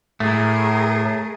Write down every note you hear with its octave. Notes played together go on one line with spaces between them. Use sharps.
A2 A3 G#4 A#4